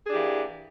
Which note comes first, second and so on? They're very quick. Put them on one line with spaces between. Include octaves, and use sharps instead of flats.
G#4 D4 G4 E3 A#3